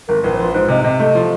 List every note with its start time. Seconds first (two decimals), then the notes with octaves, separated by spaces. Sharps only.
0.08 G#1 A#4
0.23 A#1 B4
0.34 C5
0.38 F3 B4
0.54 G#2 C5
0.68 C3 D#5
0.84 C3 D#5
1.00 A3 D#5
1.15 F3